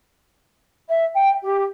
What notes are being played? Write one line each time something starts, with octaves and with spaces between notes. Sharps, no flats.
E5
G5
G4